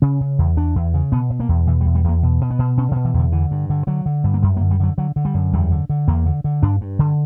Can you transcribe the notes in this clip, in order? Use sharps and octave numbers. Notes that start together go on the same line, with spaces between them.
C#3 C#4
C#3
E2
E2 D4
E2
C#3
B2 B3
B2
A#3
E2
B2 E3
G3
E2
G3
E2 A#3
B2
B2
B3
B2
B2 C#4
D3
B2
E3
E2 D3
D3 E3
G2
D3
D3 F#3
D3
G2
A#3
F#2 G3
A#3
D3
G3
D3 F#3
D3 F#3
D3
G3
F#2
E2 G3
D3
D3
E2 A#3
D3
D3
G2 D4
G2
D3